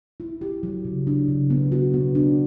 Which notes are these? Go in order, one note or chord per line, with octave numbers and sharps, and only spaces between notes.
E4
G4
F#3
C#3
D4
C#3
B3
F#4
B3
D4